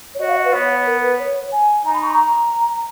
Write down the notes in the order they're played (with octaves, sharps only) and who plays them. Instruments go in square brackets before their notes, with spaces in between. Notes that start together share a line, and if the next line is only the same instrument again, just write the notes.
[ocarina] C#5
[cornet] F#4 [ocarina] D#5
[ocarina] F5
D#5
B4
[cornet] B3 [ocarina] C#5
[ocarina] A#4
B4
C#5
G#5
[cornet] D#4 [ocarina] A#5
[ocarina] B5
C#6
A#5